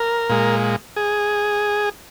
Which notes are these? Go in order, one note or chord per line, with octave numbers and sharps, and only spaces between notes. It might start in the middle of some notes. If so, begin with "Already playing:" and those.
Already playing: A#4
A#2 G#3
G#4